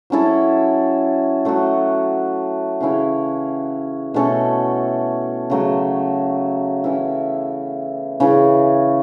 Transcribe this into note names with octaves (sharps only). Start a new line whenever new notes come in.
F#3 C#4 E4 A4
F#3 A3 F#4
C#3 E3 C#4 E4
B2 A3 C#4 A4
C#3 F#3 A3
E3 C#4 E4
C#3 E3 C#4